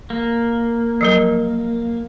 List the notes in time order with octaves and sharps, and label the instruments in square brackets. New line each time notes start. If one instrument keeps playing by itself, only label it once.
[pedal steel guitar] A#3
[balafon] F3 F#3 A#4